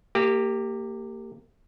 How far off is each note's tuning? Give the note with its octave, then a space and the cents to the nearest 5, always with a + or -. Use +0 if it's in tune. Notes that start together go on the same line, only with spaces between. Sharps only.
A#3 -30 G4 +0